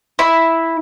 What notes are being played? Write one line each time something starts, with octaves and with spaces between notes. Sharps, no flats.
E4